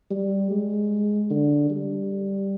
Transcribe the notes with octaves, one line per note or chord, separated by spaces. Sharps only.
G3
G#3
D3
G3